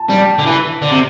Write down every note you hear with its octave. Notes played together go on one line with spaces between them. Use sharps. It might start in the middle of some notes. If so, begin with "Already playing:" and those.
Already playing: A5
G3
D3
E3
D3
C3